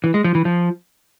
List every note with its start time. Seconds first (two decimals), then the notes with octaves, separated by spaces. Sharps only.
0.04 E3
0.14 G#3
0.24 F3
0.35 E3
0.45 F3